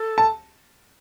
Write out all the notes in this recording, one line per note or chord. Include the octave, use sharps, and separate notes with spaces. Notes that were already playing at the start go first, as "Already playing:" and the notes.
Already playing: A4
A5